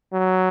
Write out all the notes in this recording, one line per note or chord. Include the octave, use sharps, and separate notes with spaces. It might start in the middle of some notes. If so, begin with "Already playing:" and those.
F#3